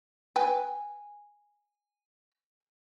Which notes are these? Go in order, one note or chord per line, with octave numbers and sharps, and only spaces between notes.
B4 G5 G#5